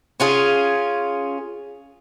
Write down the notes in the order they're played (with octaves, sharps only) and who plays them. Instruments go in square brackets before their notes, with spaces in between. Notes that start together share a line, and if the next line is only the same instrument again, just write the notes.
[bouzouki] C#4 F4 G#4